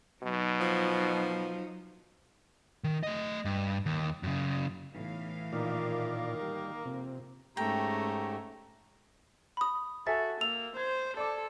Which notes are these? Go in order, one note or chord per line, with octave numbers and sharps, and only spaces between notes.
B2 F#3 D#4
F3
D#3
A3 D#5
G2
D#2
F#2 C#3
B1 A2 E3 F5
A#2 D#3 A#3 F4 D5
G3
F2 C3
G#2 A3 C#4 G4 G5 A#5
B5 D#6
F#4 A4 E5 G#5 A6
A#3 E6 F7
C5 G#6
A4 D5 D6